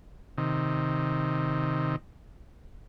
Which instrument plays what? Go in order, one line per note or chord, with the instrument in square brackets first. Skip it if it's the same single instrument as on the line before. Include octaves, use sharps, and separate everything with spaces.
[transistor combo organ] C3 D#3